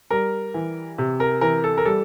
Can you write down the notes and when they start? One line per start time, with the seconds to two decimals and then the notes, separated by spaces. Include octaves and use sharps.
0.11 G3 A#4
0.54 E3
0.98 C3
1.20 A#4
1.41 E3 A#4
1.64 A4
1.77 A#4
1.85 G3 A4